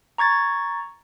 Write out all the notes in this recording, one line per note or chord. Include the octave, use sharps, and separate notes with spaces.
A#5 C#6 G#6 A6